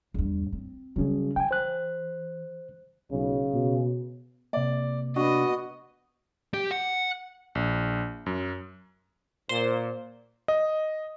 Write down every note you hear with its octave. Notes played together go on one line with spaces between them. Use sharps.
E2 G2
C4
C#3 F#3 G3 C#4 G#4
E3 G5 G#5
C5 F#6
B1 C#3
B2
C3 A#3 D5
B3 D4 F#4 D#5
G4
F#5
A#1
F#2
A#2 C5
D#5